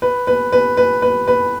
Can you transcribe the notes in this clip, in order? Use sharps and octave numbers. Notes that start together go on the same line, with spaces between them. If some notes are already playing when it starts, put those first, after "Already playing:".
B4
B4
B4
B4
B4
B4